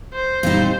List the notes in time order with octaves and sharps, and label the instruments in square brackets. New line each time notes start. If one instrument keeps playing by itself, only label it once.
[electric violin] C5
[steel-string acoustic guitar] A#2 G3 C4 D#4